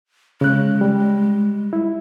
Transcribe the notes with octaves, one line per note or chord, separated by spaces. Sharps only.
C#3 G#3 F#6
G3
E4